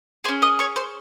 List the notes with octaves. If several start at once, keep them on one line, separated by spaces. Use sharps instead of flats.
C#4 G#4 C5 C6
D#5 D#6
C#5 C#6
C5 C6